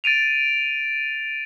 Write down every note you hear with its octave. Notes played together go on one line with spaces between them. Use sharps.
A6 D7 D#7 F7